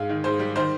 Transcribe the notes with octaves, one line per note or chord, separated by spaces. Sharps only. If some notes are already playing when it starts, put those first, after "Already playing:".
Already playing: G#2 F5
D#3
G#2 C5
G3
D#3 C5